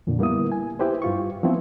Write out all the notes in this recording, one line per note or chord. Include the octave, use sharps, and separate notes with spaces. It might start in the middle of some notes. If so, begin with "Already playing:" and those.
F2 A#2 D3
G3 A#3 B3 E4 D#6
G#5
E4 G4 B4 C5
G2 F4 C#6
F3 B3 C4 E4